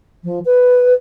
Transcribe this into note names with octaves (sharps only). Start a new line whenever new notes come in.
F3
B4